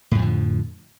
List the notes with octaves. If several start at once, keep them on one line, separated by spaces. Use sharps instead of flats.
F2 A2 D3 F3